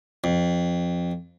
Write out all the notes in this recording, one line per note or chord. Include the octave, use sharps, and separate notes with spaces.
F2